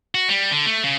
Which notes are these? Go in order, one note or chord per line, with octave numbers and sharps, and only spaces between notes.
F#4
G3
D3
A3
C#3